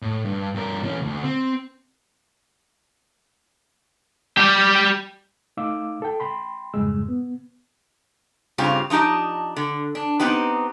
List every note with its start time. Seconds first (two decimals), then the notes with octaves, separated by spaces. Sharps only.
0.02 A2
0.25 G2
0.54 G2 A#4
0.83 E3 C#4
1.02 D2
1.23 C4
4.38 G3 G4
5.57 A3 D#4 F5 D6 E6
6.02 A4 G5
6.20 G5 B5 C6
6.74 F2 G#2 C#3 G3 G#3 E6
7.08 B3
8.58 G2 C#3 C4 F4 G4
8.90 F3 D4 D#4 G4 D#5
9.56 D3
9.95 D4
10.19 B3 C4 D#4 G4 B4